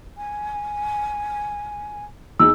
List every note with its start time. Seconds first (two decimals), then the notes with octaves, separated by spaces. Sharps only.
0.17 G#5
2.40 E2 D#4 G#4 E6